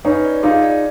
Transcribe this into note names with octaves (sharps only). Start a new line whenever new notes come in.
C#4 D#4 B4
D5
D#4 F4 G#4
D5